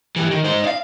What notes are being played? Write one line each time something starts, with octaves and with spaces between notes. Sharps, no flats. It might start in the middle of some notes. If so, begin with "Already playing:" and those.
E3 G4
D#3
D#4 C5
D5 F5